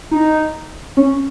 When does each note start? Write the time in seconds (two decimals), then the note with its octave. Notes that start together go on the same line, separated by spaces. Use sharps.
0.11 D#4
0.97 C#4